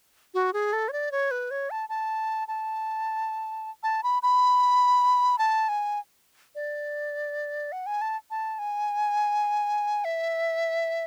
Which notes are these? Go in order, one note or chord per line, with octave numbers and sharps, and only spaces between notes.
F#4
G#4
A4
C#5
D5
C#5
B4
C#5
A5
A5
A5
A5
B5
B5
A5
G#5
D5
F#5
G#5
A5
A5
G#5
E5